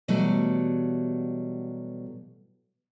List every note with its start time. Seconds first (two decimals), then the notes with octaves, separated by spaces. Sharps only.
0.08 B2 E3 F#3 G3 A3